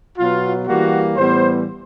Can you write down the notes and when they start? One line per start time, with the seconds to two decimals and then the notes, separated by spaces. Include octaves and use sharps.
0.18 B2 F#3 B3 F4
0.68 E3 G3 A#3 F#4
1.16 A2 E3 G3 B3 C5